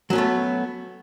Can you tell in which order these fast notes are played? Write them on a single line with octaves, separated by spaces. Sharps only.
F#3 C#4 B3 A3